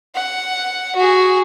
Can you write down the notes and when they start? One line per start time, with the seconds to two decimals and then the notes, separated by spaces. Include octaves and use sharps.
0.15 F#5
0.96 F#4 G#4